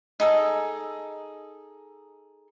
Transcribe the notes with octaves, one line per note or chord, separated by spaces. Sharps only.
D#4 G#4 A4